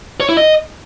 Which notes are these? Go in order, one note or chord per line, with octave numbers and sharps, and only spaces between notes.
C#5
E4
D#5